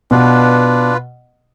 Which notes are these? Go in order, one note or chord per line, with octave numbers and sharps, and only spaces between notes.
B2 D4 F4 B4